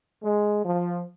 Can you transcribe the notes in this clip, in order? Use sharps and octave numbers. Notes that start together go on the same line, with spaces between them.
G#3
F3